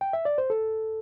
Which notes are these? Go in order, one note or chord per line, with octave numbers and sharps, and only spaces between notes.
G5
E5
D5
C5
A4